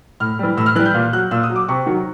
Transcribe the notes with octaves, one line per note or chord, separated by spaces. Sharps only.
A2 F6
E3 G3
A2 E6
F6
E3 G3 F#6
G6
A#2
F#3 F#6
A#2 E6
D#6
F#3
D6
C3 C#6
D#3 F#3